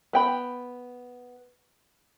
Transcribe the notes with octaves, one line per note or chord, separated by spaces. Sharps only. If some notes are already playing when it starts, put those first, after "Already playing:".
B3 G5 B5